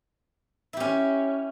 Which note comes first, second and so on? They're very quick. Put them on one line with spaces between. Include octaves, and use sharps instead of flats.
E4 G4 C#4